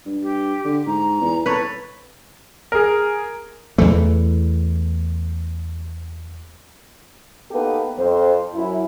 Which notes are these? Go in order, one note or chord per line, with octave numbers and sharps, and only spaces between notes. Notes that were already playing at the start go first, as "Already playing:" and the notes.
G2
G4
D3
G#2 A#5
E2
C2 A4 B4 C#5
G#4 A#4
E2 E3 A3
A#3 B3 D#4 G4 A4 B4
F2 C5
F#2 E4